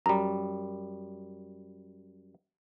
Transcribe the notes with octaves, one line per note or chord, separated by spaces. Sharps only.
F#2 G3 A#5